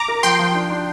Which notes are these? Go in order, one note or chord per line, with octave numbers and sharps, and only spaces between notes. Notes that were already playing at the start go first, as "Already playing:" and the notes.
Already playing: A#5 D6
A#4
F3 G5 C6
F3
D4
D4